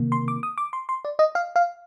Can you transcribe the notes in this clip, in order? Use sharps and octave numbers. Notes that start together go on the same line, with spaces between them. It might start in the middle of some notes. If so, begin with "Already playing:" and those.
Already playing: C3 D#3 A#3
C6
D6
D#6
D6
C6
C6
D5
D#5
F5
F5